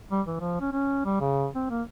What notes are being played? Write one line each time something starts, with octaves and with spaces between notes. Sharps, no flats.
G3
E3
F3
C#4
C#4
G3
C#3
C4
A#3